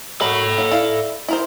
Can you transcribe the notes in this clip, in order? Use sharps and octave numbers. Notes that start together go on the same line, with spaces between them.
F#3 F#4 A4 A#4 B5
F#3 A#3
E4 D5 F5
E4 A#4 C5